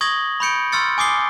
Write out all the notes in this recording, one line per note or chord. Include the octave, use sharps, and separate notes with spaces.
C#6 D#6 G#6 A#6 F#7 G7
B5 C#6 G6 C#7 D7
C6 C#6 E6 F6 A6 C#7
G#5 D6 D#6 C7 G7